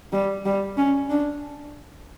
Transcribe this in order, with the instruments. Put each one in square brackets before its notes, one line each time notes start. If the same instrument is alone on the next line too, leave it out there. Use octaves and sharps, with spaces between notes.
[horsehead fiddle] G3
G3
C#4
D4